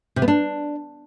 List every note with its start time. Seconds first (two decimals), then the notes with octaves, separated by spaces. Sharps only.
0.16 C3
0.22 B3
0.28 D4